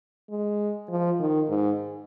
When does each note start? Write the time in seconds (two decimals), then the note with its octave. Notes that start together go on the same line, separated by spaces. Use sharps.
0.30 G#3
0.89 F3
1.19 D#3
1.49 G#2